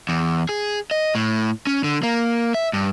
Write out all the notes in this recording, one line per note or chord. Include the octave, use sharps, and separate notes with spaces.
E2
G#4
D#5
A2
C#4
D3
A#3
E5
G2